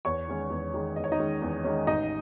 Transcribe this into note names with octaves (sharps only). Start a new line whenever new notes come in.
E2 C#5 C#6
D#3 G#3 C#4
E2
D#3 G#3 C#4
E2 D#5
C#5
D#4 D#5
D#3 G#3 C#4
E2
D#3 G#3 C#4
A1 D#4 D#5